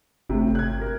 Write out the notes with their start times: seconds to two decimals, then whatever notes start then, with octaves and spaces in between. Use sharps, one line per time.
0.30 G1 A2 C3
0.55 F#6 G#6
0.81 A#4